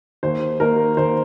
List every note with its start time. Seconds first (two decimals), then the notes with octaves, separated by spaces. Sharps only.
0.23 D#2 C5
0.59 D#3 A#3 A#4
0.97 D#2 C5